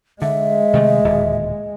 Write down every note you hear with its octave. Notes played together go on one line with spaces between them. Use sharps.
D3 G#3 E5
C3 D#3 A3
D1 D#2 A#2